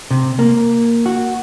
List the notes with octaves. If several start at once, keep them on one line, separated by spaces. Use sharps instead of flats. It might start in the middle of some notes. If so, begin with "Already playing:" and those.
C3
A#3
F#4